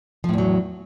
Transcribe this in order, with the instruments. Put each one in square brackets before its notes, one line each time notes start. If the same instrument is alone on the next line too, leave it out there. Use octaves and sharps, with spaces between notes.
[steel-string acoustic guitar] F3
A2
E2
F#3